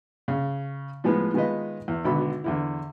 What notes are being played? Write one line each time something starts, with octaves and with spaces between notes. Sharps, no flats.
C#3
A2 F3 G#3 B3
D#3 G#3 B3 F4 B4 D#5
E2
G#1 B2 D3 B3 B5
E2 D3 E4